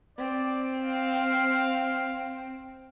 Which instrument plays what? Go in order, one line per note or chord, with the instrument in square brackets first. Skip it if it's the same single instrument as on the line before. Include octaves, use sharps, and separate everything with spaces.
[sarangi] C4 [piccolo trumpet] D5
[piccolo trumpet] F5